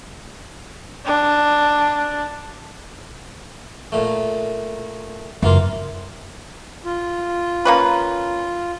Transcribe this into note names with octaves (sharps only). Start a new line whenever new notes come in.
D4
A#2 A3
F#2 C#3 E3 A#3 F4
F4
A#3 C#4 B4